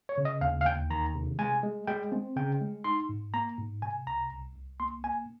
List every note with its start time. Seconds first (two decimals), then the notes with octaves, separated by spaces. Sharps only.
0.09 C#5
0.18 C#3
0.25 D#5
0.41 D#2 F5
0.61 F5
0.66 D#2 G5
0.90 D#3 A#5
1.15 C3
1.39 G#3 G#5
1.63 G#3
1.88 G#3 G5
2.12 C4
2.36 C#3 G5
2.61 G#3
2.84 D#4 C6
3.09 G#2
3.34 A#3 A#5
3.58 G#2
3.82 C3 G#5
4.07 C2 A#5
4.31 C2
4.55 C2
4.80 A#3 C6
5.04 A#3 G#5